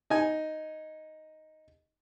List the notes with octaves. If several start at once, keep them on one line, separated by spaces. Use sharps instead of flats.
D#4 G#5